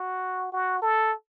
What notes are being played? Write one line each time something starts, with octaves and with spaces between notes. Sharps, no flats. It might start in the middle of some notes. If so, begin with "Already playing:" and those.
Already playing: F#4
F#4
A4